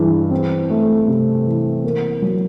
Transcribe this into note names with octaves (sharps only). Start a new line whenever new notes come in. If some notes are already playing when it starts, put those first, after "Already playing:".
Already playing: G2 E3 G#3
C4
A3
C3
E3
A#3
F#3